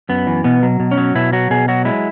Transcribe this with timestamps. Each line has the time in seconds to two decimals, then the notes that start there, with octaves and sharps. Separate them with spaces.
0.09 F#2 B3
0.27 E3
0.44 B2 B3
0.63 F#3
0.80 B2
0.91 C#4
0.97 F#3
1.15 B2 E4
1.33 F#3 F#4
1.50 B2 G#4
1.68 F#3 F#4
1.85 G#3 E4